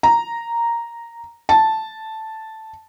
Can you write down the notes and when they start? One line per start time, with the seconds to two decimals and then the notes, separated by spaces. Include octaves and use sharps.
0.03 A#5
1.49 A5